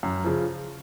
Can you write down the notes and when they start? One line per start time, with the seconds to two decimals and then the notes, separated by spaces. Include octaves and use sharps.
0.03 F#2
0.24 C#3 F3